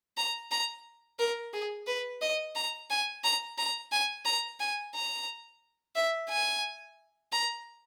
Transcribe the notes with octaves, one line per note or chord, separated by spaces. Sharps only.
A#5
A#5
A#4
G#4
B4
D#5
A#5
G#5
A#5
A#5
G#5
A#5
G#5
A#5
E5
G#5
A#5